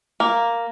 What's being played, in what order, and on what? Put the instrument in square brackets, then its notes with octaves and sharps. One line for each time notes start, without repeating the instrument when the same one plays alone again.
[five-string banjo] A#3